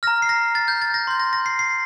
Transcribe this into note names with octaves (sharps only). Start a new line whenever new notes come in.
A#5 F6 A#6
C7
A#6
A6
G6
A6
A#6
C6 G6
A#6
A#6
C7
C7